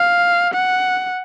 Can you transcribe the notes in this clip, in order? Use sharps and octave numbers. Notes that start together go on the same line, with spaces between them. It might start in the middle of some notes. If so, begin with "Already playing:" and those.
Already playing: F5
F#5